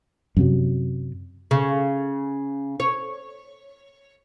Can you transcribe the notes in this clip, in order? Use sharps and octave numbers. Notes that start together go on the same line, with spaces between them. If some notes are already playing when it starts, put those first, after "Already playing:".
F#2 C3 F#3
C#3
C#5